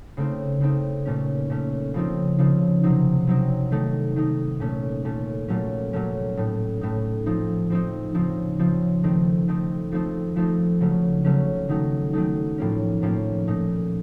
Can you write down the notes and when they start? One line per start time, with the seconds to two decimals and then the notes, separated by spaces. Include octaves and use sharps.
0.17 C#3 A3 C4 D#4
0.61 C#3 A3 C4 D#4
1.05 A#2 A3 C#4
1.50 A#2 A3 C#4
1.94 C#3 F3 C4 D#4
2.39 C#3 F3 C4 D#4
2.83 C3 F#3 C4 D#4
3.27 C3 F#3 C4 D#4
3.71 D#3 A3 D#4
4.16 D#3 A3 D#4
4.60 A#2 A3 C#4
5.05 A#2 A3 C#4
5.48 A#2 F#3 A3 C#4
5.93 A#2 F#3 A3 C#4
6.37 A2 A3 D#4
6.81 A2 A3 D#4
7.26 F3 C4 D#4
7.70 F3 C4 D#4
8.15 C#3 F3 C4 D#4
8.59 C#3 F3 C4 D#4
9.03 D#3 A3 C4 D#4
9.48 D#3 A3 C4 D#4
9.92 F3 A3 C4 D#4
10.36 F3 A3 C4 D#4
10.81 C#3 F#3 A3 C#4
11.25 C#3 F#3 A3 C#4
11.69 D#3 F#3 A3 D#4
12.13 D#3 F#3 A3 D#4
12.58 A2 F3 A#3 C#4
13.02 A2 F3 A#3 C#4
13.47 A#2 A3 D#4